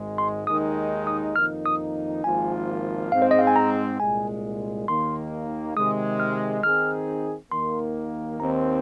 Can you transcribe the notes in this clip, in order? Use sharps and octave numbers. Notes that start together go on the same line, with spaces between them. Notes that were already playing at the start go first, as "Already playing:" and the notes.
Already playing: G#1 G#2 G#3
C6
D#2 D#3 G#3 D#4 D#6
D#6
F2 D#3 A#3 D#4 F6
D#6
G#1 G#2 F3 A#3 F4 G#5
G#2 G#3 C4 F5
C5
D#5
F5
G#5
A#5
C2 A#2 G#3 G#5
D#2 D#3 A#3 C6
C3 D#3 G#3 D#6
F6
D#3 C4 D#4 G#4 F6
D#2 D#3 A#3 C6
D#2 D#3 C4 A#5